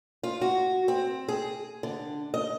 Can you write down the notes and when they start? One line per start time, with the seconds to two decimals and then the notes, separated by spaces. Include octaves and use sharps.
0.23 F4
0.41 F#4
0.88 C4
1.28 G#4
1.83 D3
2.34 D#5